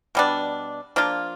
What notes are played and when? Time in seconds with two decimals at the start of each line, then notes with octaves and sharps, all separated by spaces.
0.15 B2 G3 B3 D4
0.96 F3 A#3 D4 F4